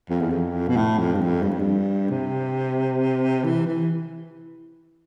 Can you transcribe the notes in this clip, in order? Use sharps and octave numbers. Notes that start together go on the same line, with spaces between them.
F2
E2
F2
B2
A2
F2
G2
F2
G2
F2
G2
C3
E3
E3